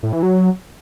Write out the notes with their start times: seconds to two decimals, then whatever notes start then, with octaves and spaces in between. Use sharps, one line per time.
0.03 A2
0.13 E3
0.23 F#3